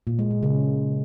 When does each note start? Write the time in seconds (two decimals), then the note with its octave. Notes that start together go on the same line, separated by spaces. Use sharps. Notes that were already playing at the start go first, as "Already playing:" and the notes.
0.07 A#2
0.19 G#3
0.31 A#2
0.43 C#3